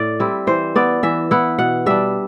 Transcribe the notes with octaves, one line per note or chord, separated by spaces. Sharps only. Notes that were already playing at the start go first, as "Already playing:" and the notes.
Already playing: A2 D5
G3 C4 E4
E3 C5
B3 E4 D5
E3 E5
B3 E4 F#5
B2 F#5
G3 D4 E5